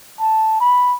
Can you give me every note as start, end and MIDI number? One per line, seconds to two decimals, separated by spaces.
0.20 0.59 81
0.60 0.96 83